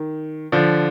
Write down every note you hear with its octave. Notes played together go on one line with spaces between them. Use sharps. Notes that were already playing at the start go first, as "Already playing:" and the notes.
Already playing: D#3
D3 F3